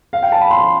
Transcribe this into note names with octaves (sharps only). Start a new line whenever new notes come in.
F5
G5
A5
B5
C6